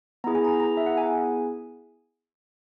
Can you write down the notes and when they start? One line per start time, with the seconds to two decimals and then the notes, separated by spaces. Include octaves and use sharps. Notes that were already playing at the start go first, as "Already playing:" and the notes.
0.24 B3 E4 G#4 A#5
0.35 G#5
0.45 A#5
0.60 A#5
0.77 E5
0.86 F#5
0.97 G#5